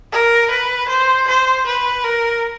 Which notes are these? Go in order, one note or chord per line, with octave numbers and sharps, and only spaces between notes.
A#4
B4
C5
C5
B4
A#4